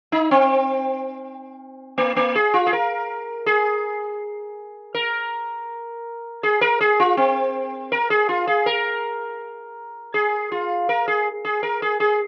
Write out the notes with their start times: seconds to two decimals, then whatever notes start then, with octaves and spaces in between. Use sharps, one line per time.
0.12 D#4
0.31 C4
1.98 A#3
2.16 A#3
2.35 G#4
2.54 F4
2.67 G#4
2.73 A#4
3.46 G#4
4.94 A#4
6.43 G#4
6.61 A#4
6.80 G#4
7.00 F4
7.17 C4
7.92 A#4
8.10 G#4
8.29 F4
8.47 G#4
8.66 A#4
10.14 G#4
10.52 F4
10.89 A#4
11.08 G#4
11.45 G#4
11.63 A#4
11.82 G#4
12.00 G#4